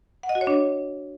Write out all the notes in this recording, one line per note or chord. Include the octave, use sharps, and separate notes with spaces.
F#5
D#5
F#4
C#5
D4